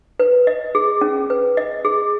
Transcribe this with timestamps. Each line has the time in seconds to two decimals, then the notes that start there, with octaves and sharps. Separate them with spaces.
0.20 B4
0.47 D#5
0.75 G#4
1.01 C#4
1.30 B4
1.57 D#5
1.85 G#4